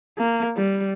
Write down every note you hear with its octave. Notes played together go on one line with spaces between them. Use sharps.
A#3
G3